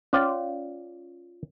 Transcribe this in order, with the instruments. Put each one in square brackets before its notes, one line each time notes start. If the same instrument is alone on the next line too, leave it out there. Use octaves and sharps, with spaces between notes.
[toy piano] C#4 C#5 [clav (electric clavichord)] F4 D5